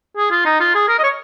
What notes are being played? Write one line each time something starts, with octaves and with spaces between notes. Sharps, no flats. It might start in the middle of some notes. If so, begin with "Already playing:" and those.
G#4
F4
D#4
F4
G#4
A#4
D#5
C#5